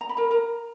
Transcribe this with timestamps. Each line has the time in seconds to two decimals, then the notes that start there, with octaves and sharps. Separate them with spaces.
0.01 A#5
0.09 B5
0.17 A#4 A#5
0.31 A#4 A#5